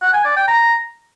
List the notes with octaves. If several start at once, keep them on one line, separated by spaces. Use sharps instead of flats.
F#5
G#5
D5
G5
A#5